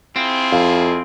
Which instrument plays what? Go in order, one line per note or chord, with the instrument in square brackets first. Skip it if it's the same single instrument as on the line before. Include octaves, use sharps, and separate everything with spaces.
[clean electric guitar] C4 [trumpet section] E4 F4 G#4
[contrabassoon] F2 [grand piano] F5